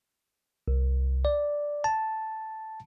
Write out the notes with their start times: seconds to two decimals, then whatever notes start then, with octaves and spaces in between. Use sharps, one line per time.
0.68 C2
1.25 D5
1.84 A5